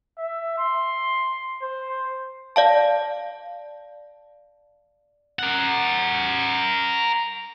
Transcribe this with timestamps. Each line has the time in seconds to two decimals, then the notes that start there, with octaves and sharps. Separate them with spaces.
0.18 E5
0.58 C6
1.62 C5
2.56 D5 F5 A5
5.39 A#4 F#5